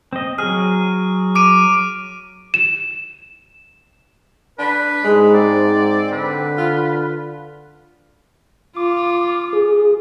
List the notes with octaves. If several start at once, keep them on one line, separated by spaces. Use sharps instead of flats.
C4 D#5
F#3 G#4 F6
D6 D7 D#7
E7
D4 B4
G#2 G#3
C4 D5
D3 B4
F4
F4 D6
G#4